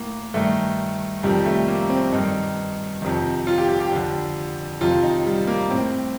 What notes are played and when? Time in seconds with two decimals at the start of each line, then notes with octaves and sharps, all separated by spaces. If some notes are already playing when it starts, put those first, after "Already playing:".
Already playing: A2 A#3
0.34 G2 D#3 A3
1.23 F2 C3 D#3 G3
1.45 A3
1.68 A#3
1.90 C4
2.12 G2 D#3 D#4
3.02 F2 C3 D#3
3.47 F4
3.58 G4
3.69 G4
3.80 G4
3.91 F2 D3
4.81 F2 C3 D#3 F4
5.03 D#4
5.26 G3
5.47 A#3
5.71 A2 C4